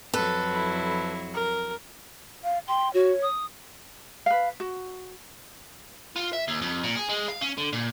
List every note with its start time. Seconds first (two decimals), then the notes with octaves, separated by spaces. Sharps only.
0.14 F2 F#3 A4 B4
0.54 E4
1.34 A#4
2.44 F5
2.68 G5 C6
2.94 F#4 C#5
3.22 D#6
4.26 B4 F5
4.60 F#4
6.16 F4
6.33 E5
6.48 D#2
6.62 F2
6.84 A#2
6.96 G#4
7.09 G#3
7.28 F5
7.41 C#4
7.58 D3
7.73 A#2